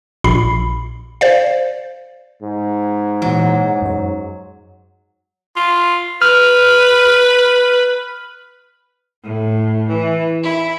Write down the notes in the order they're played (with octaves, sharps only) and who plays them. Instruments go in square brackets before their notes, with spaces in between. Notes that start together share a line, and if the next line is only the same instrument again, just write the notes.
[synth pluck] A#1 A#2 B5 C7
C5 D5 F5
[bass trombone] G#2
[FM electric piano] A#2 E3 [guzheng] F#3
[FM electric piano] F#2 C#5
[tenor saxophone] F4
[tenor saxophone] B4 [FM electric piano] F6
[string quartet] A2
E3
E4